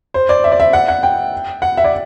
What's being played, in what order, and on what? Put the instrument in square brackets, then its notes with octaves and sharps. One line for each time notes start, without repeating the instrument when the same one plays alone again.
[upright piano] C5
D5
E5
D5
E5
F#5
F#5
G5
F#5
E5
D5